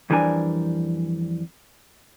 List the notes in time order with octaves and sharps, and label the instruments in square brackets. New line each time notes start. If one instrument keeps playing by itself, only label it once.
[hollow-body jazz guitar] F2 E3 G3 D4 A#4 G#5